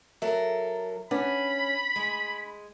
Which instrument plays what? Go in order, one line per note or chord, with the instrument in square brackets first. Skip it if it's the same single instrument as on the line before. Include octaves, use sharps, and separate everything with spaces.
[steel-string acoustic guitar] F#3 A4 A#4 [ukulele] E5
[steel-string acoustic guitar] C#4 [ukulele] D4 B4 F#5 [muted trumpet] B5
[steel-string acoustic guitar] G#3